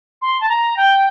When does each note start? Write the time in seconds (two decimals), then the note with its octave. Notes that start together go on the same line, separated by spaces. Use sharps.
0.22 C6
0.41 A5
0.49 A#5
0.77 G5